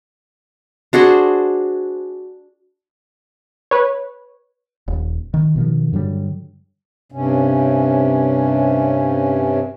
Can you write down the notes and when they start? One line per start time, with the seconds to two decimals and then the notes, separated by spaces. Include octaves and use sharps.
0.93 D4 F#4 G#4 C5
3.71 B4 C#5
4.88 D#1
5.34 D#3
5.56 B2 D#3 F3
5.92 G2 D3 F#3 G3
7.12 G2 C3 C#4